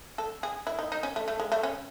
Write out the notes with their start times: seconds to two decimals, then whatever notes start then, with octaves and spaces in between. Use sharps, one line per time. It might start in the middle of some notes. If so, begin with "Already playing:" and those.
0.18 A4
0.43 G#4
0.67 E4
0.79 D#4
0.92 D#4
1.03 C#4
1.16 A3
1.28 A3
1.40 G#3
1.52 A3
1.63 C#4